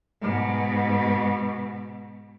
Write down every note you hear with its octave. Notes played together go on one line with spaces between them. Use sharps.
G#2 B2